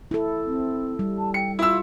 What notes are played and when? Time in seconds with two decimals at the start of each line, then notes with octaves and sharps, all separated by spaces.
0.11 E4 A4
0.44 C4
0.99 G3
1.18 A5
1.34 G5 C#7
1.59 E4 F4 E6